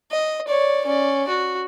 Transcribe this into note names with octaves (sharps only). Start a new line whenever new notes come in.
D#5
C#5 D5
C#4 D5
F#4